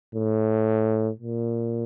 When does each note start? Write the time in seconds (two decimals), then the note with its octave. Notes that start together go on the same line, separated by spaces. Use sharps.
0.15 A2
1.20 A#2